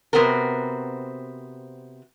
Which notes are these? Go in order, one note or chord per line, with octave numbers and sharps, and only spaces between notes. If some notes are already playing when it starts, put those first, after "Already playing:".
C3 B3 C4 F#4 A#4